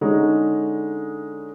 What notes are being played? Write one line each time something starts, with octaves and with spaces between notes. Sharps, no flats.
D3 G#3 C#4 D#4